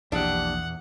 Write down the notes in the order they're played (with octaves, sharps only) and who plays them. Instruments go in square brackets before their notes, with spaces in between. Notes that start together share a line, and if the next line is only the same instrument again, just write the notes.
[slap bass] A#1 B2 [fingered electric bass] E2 [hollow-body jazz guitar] D4 G4 [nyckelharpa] F#5